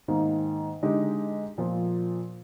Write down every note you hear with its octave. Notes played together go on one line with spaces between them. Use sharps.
G#2 D#3 A#3
D3 G#3 D#4 G4
A#2 F3 A#3